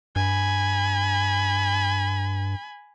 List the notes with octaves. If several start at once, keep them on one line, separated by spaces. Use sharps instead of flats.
G2 G#5 B5